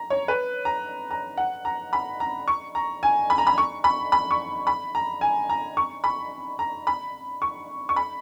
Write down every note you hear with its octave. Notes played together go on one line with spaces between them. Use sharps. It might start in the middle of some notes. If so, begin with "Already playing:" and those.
Already playing: A#5
C#5
B4
A#5
A#5
F#5
A#5
B5
A#5
C#6
A#5
G#5
B5
A#5
B5
C#6
B5
B5
C#6
B5
A#5
G#5
A#5
C#6
B5
A#5
B5
C#6
C#6
B5